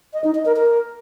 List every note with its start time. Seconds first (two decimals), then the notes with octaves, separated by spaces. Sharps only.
0.13 D#5
0.24 D#4
0.35 D#5
0.45 A#4
0.56 A#4